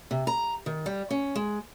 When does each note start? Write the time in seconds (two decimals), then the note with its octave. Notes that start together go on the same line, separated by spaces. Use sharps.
0.11 C3
0.27 A#5
0.66 D#3
0.86 G3
1.11 C#4
1.36 G#3